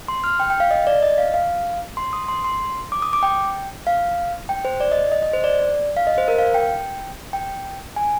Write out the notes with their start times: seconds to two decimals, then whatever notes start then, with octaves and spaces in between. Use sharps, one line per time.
0.08 C6
0.24 F6
0.40 G5
0.50 G5
0.60 F5
0.71 D#5
0.87 D5
1.02 D#5
1.18 F5
1.34 F5
1.97 C6
2.13 D#6
2.28 C6
2.44 C6
2.92 D6
3.02 D#6
3.13 D6
3.23 G5
3.87 F5
4.49 G5
4.65 C5
4.80 D5
4.92 D#5
5.12 D#5
5.23 D#5
5.33 C5
5.44 D5
5.96 F5
6.07 D#5
6.18 C5
6.28 A#4
6.38 F5
6.54 G5
7.33 G5
7.96 G#5